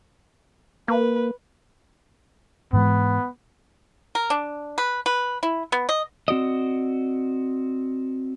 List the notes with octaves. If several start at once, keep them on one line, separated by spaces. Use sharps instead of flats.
A#3 B4
G#2 E3 G#3 B3
A#4
D4
B4
B4
E4
B3
D#5
C4 F#4 D5 D#5